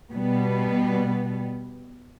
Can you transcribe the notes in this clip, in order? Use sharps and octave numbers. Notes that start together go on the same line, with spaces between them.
B2 G3 B3